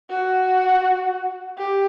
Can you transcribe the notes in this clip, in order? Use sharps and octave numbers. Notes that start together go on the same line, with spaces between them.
F#4
G4